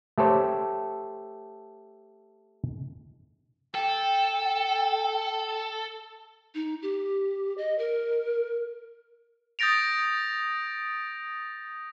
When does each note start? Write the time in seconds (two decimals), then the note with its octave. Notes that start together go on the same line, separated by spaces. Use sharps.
0.18 A3 G4 A4 C5 C#5
3.74 A4 G5
6.55 D#4
6.82 G4
7.58 D#5
7.78 A#4
9.59 D#6 G6 A6 A#6 D7 F7